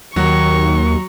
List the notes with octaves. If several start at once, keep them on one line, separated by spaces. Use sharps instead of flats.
D#2 D#3 F#3 F#4 C#6